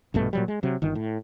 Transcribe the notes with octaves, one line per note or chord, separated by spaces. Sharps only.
A#1 G2 B2 A3
A#2 F#3 G3
G#3
C3 F#3
G1 D#3
A2